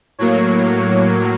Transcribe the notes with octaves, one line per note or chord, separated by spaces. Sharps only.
A2 F#3 A#3 C#5